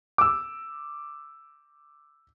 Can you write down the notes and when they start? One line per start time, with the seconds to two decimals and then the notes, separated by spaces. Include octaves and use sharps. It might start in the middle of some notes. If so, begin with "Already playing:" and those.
0.18 D6 E6